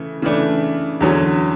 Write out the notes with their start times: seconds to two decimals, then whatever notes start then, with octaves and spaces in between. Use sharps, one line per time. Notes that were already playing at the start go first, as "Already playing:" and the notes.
Already playing: C#3 E3 A3
0.22 C#3 E3 A3 D4
1.01 E2 D3 F#3 C#4